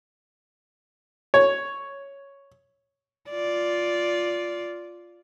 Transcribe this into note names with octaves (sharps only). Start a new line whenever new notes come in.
C#5
F4 D5